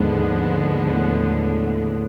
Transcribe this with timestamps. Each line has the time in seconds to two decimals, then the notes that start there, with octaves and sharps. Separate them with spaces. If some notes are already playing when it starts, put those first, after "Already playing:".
Already playing: D#2 G#2 D3 F3 G#3 B3
0.92 A2